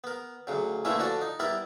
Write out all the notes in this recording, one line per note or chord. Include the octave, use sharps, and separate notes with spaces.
B3 A#4
D2 C#3 F#3
D3 E3 A3 A#3 C#4 E4
D3 F3 D4 F#4 D5
D#4
G3 B3 E4 A#4 D5